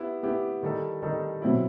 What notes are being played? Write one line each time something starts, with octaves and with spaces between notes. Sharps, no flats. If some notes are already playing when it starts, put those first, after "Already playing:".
Already playing: B3 E4 G4
B3 E4 G4
D#3 G3 D#4 A4
D#3 G3 D#4 A4
B2 F#3 C4 E4